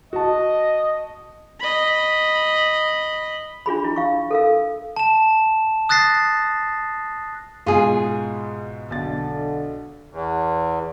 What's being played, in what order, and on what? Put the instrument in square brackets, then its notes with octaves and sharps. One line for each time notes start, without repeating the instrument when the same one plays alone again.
[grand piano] F#4 A5 [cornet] D#5
[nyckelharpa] D#5 B5
[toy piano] D4 F4 G#4 B5
E4
F5 C#6
A4 A#4 F5
[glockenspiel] A5 E7
D#6 F#6 A6 A#6 C7
[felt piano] G#2 B2 [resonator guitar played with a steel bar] F4 G#4
[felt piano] B1 A6 [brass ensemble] D3
[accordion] E2